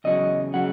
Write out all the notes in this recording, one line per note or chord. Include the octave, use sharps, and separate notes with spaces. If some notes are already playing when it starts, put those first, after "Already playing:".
E2 C#3 F#3 D#5
C#3 F#3 F#5